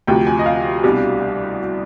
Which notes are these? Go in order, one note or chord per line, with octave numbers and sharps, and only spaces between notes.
D2 C3 F3 G5
G#5
D#5
F5
C2 B2 G3 D4